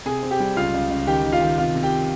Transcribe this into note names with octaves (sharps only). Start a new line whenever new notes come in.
C3 G#4 G#5
C4
G4 G5
G3
C#2 F4 F5
C#2
C#2
D#3 G4 G5
D#3
F4 F5
D#3
C3 F4 F5
C3
G4 G5